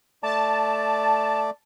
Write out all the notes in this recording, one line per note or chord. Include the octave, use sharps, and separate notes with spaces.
A3 D5 A5